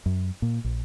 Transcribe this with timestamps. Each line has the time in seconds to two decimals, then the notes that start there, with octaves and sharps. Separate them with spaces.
0.06 F#2
0.42 A#2
0.64 A#1